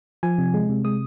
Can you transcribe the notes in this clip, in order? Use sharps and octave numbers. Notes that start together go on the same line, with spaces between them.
F3 G#5
C3
G#3
C3
G#3 D#6